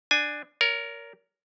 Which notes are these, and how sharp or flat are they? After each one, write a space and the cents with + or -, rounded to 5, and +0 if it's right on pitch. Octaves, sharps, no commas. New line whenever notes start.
D4 +10 G#5 +0
A#4 +0 C#5 +40